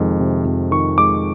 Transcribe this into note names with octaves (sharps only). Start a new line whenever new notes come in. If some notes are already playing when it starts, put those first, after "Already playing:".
Already playing: F2 C3 D#3 G#3
C3
F2
D#3 C#6
G#3 D6